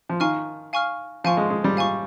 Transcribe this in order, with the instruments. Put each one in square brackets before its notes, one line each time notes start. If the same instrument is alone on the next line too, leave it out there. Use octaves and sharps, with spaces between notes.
[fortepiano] F3
[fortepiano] D#3 [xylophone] F5 G#5 C#6 F6
[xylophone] F5 G#5 C#6 F6
[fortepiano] F3 [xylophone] F5 G#5 C#6
[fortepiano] G#3
G#3
G3
[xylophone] F5 G#5 C#6